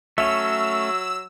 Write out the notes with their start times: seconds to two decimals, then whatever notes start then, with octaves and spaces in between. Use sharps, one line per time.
0.18 F#3 A3 C#4 E5 E6